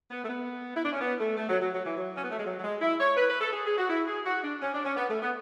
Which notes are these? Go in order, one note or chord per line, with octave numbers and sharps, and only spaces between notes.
B3
A3
B3
E4
D4
C#4
B3
A3
A3
F#3
F#3
F#3
E3
F#3
C#4
B3
A3
G#3
F#3
F#3
G#3
E4
C#5
B4
B4
A4
G#4
G#4
F#4
E4
G#4
F#4
D4
C#4
D4
C#4
B3
A3
B3